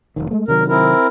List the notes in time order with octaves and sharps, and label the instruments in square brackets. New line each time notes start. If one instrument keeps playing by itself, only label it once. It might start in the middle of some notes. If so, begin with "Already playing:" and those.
[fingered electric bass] F1 A#1 D#3
G#3 A3
[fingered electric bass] C3 D#3 F#3 [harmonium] A#4
[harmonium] C4 E4 A#4